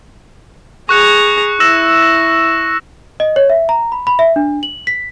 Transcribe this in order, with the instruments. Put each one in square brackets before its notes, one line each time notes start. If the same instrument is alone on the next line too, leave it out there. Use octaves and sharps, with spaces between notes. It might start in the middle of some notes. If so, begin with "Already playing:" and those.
[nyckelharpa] G#4 A#5 [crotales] C#6 F#6 C#7
[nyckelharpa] E4 [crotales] E6 A#6 E7
[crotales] A#6
[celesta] D#5
C#5
E5
A#5
B5
B5
E5
D4
F#7
B6